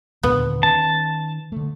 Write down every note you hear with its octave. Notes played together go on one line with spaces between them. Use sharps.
D#2 A#2 D3 B3
D#3 C#4 A5
D3 A3